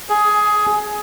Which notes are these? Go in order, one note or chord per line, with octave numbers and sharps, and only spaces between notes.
G#4